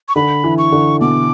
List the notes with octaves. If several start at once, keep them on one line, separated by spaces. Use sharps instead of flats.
C#6
D3 B5
E3
C#6
D3
B2 D6